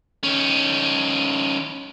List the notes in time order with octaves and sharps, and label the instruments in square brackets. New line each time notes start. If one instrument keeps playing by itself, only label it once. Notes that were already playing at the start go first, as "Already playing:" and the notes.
[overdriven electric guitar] D#3 C#4